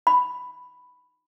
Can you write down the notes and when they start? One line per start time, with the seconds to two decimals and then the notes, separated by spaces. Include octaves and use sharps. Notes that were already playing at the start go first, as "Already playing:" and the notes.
0.07 B5